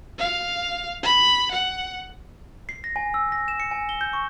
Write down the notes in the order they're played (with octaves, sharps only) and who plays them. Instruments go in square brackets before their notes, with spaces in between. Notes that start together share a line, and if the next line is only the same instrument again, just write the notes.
[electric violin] F5
B5
F#5
[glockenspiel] C7
A#6
G#5
E6
A#6
E7
C#7
G#5
G7
G6
C#6